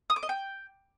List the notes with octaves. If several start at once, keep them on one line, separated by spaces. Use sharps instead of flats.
D#6
D6
D#5
G5